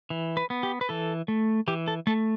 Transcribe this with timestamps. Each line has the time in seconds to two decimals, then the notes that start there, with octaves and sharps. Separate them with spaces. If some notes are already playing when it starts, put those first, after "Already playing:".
0.10 E3
0.37 B4
0.50 B3
0.63 G4
0.81 B4
0.89 E3 A4
1.28 A3
1.68 E3 G4
1.88 A4
2.07 A3 A4